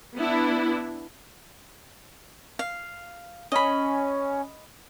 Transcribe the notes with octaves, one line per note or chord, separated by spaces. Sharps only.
B3 D4 E4
F5
C#4 D#5 B5